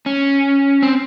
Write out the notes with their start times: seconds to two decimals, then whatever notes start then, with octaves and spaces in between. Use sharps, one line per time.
0.06 C#4
0.82 C4